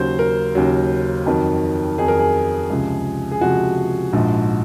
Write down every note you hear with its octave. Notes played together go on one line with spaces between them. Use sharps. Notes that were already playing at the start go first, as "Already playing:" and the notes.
Already playing: D#2 C#3 F#3 C5
A#4
D#2 C#3 F#3
F2 D#3 F#3
F2 D#3 F#3 G#4
A#4
G#4
C#2 C3 F3
G#4
C#2 C3 F3 F#4
A#1 G#2 F3